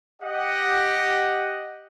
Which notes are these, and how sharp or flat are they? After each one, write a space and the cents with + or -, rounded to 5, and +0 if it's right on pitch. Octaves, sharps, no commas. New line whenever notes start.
G4 +0 D#5 +0 F#5 +0